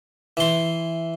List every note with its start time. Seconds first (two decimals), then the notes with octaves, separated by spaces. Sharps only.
0.37 E3 C6